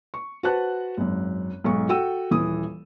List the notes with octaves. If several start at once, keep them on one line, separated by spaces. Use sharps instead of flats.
C#6
F#4 B4 C5 F#5 A5 F#6
G#1 F#2
B1 G#2 C#6
F#4 A4 G5 E6 D#7
D#1 E3 D#6